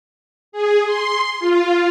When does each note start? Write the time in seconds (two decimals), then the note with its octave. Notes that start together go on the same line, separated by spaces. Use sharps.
0.52 G#4
0.85 C6
1.40 F4